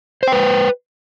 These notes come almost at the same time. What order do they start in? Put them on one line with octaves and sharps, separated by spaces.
C5 G5 B4